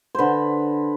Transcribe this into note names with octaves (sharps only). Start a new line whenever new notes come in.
D3 B4 C5